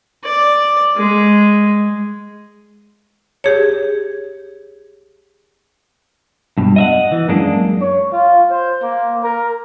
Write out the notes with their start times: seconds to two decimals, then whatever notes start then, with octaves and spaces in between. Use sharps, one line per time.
0.24 D5
0.96 G#3
3.44 G4 G#4 C#5
6.58 G2 B2
6.76 D#5 E5 F#5
7.12 E3
7.28 F#2 G#3 A#3 D4
7.81 C#5
8.13 F4
8.50 C5
8.83 A#3
9.24 A#4